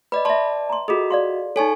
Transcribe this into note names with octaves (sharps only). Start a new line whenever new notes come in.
B4 D5 D#5 B5
D5 E5 A5 C6
A#5 C6
F4 F#4 G#4 A4 D#5
D5 F5 C6
D#4 A4 C#5 G#5 C#6